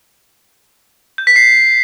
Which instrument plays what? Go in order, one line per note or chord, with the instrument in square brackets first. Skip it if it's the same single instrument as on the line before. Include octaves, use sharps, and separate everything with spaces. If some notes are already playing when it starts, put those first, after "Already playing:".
[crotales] G6
B6
C7